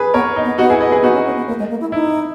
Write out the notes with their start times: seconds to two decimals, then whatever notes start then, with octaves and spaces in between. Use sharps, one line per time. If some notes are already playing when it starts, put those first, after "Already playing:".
Already playing: G#4 B4
0.14 B3 A#4 C#5
0.36 D#4
0.44 B3
0.58 B3 D#4 F#4
0.70 E4 G#4
0.80 B4 D#5
0.92 G#4 B4
1.03 B3 D#4 F#4
1.14 C#4
1.26 C#4
1.37 B3
1.48 A#3
1.59 G#3
1.70 A#3
1.81 E4
1.92 D#4 E4